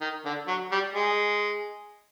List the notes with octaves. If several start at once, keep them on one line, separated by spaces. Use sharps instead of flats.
D#3
D3
F#3
G3
G#3